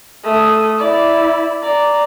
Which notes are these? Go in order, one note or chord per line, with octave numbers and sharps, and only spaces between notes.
A3 D#6
E4 D5
D5 A#5